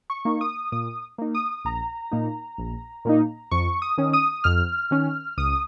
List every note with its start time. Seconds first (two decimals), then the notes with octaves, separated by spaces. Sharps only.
0.10 C#6
0.25 A#3 D#4
0.41 D#6
0.72 A#2 D#6
1.18 A#3 D#4
1.35 D#6
1.64 A#1 A#5
2.11 A#2 A#3 D#4
2.58 A#1
3.05 A#2 A#3 D#4
3.51 F2 C#6
3.82 D#6
3.98 D#3 C#4
4.13 D#6
4.44 F2 F6
4.91 D#3 C#4
5.38 C#2 D#6